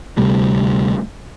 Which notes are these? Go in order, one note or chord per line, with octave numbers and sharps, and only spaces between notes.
D2 C3 G3 A3